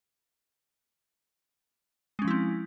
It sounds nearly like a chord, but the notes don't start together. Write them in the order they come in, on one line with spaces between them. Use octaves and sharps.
G#3 C#4 F3 E4 C4